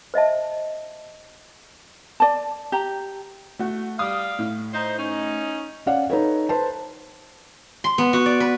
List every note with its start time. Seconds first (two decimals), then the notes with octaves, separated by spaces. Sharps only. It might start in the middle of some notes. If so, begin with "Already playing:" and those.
0.14 C5 D#5 E5 A5
2.20 D5 A5
2.72 G4 A#5
3.59 A3 F#4
3.99 G3 F5 D#6
4.39 A2
4.74 D#4 C5
4.98 C#4 D#4
5.86 C#4 D5 F5 F#5
6.10 D#4 A4 B4 C#5
6.49 B4 C5 A5
7.84 C6
7.98 B3
8.13 F#4
8.26 D5
8.40 B4